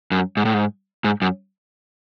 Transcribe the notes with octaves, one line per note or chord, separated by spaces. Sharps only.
F#2
G#2
A2
G#2
G#2
F#2